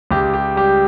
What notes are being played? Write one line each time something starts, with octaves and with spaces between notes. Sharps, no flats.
C#2 G4
G4
G3 G4